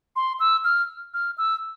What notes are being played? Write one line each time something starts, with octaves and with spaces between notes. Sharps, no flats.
C6
E6
F6
F6
E6